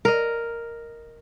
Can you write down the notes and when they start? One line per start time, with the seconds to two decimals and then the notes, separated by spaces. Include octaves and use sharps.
0.05 A#4 D#5